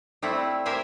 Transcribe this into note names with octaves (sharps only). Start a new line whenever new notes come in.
G3 A3 C4 E4
G4 A#4 C5 E5 G5 G#5